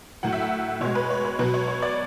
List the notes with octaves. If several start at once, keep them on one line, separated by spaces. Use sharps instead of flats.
A2 F#3 F#5
E5
F#5
B2 G#3 C#5
B4
C#5
B4
B2 F#3 B4
C#5
C#5
D5